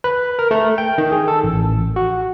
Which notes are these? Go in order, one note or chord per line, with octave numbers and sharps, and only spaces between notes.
B4
A#4
A3
G5
D#3
G#4
A4
A1
F#4